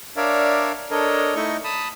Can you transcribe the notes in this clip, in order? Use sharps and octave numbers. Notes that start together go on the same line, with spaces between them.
D4 A#4 C#5 D5 E5 F5
D4 A4 A#4 C#5 D#5
A3 D#4 E4 A4 D#5 C#6
A5 B5 D#6